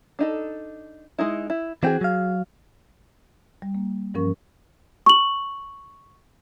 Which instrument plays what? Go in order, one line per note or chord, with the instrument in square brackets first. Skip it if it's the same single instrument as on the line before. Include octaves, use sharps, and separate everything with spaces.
[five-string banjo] D4 D#4 A4
G#3 D#4 E4
E4
[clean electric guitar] E3 C4 G5 [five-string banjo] F#4 G#4
[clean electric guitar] F#3 F5
[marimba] G3
A#3
G2 E3 F3 C#4 A#4 C#6
[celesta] C#6 F#7